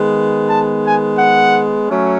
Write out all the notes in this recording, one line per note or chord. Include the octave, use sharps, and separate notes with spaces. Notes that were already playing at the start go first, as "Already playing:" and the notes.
Already playing: D#3 G#3 B3
A5
G#5
F#5
F#3 A3 C#4